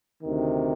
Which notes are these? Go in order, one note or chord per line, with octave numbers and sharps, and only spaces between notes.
D2 C3 D#3